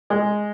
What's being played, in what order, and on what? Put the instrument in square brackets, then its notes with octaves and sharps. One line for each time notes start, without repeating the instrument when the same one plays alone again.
[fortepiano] G#3